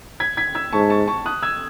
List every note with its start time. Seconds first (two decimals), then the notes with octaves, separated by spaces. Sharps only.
0.20 G#6 B6
0.37 G#6 B6
0.55 E6 G#6
0.73 G#2 A5 C#6
0.90 A5 C#6
1.08 A5 C#6
1.26 D#6 F#6
1.42 E6 G#6